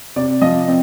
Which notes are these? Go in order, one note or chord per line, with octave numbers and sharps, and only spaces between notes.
C3 D5
F3 D#5
C4